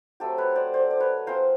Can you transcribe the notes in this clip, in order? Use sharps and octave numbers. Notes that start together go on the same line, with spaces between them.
F#3 A3 C4 G4 A4
B4 C#5
C5 D5
C5 D5
D5
B4 C#5
G#3 C4 F4 A#4 C5